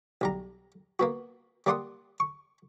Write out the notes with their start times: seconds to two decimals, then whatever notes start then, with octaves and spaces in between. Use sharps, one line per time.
0.21 B1 G3 A#5
0.99 A#3 B3 F#4
1.66 G3 A#3 D5 F#5 C6 D#6
2.20 C#6